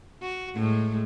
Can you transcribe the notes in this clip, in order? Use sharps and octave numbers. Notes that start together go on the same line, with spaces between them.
F#4
A2 G#3 A3